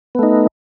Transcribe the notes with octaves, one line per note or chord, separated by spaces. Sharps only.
A3 B3 D#4